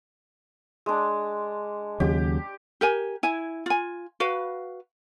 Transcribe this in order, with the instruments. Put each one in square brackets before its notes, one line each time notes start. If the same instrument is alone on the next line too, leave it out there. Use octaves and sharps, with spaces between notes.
[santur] G#3 D4
[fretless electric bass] D#2 C#3 F#3 [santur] G4
[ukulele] G4 A#4 G#5
E4 G#5
F4 G#5
F#4 B4 F5